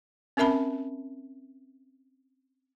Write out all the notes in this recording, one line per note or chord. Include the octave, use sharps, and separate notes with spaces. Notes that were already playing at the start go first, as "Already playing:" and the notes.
C4 C#4 A#4 E5 A5 B5